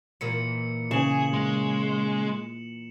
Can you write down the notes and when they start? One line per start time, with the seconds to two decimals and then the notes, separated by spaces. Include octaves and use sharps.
0.21 A#2 E3 A#3 C#7
0.91 C#3 G#4 E7 F#7
1.33 G#3